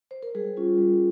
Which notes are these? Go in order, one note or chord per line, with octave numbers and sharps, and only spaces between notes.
C5
A#4
G3 G#4
C#4 F4
G3